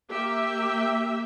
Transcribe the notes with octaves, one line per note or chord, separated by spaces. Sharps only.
A#3 G4 E5